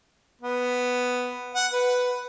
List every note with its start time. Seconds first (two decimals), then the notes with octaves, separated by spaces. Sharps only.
0.41 B3
1.55 F#5
1.73 B4